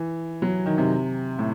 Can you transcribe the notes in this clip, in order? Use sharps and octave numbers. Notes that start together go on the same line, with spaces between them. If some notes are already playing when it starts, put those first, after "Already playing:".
Already playing: E3
F#3
D#3
C3
A2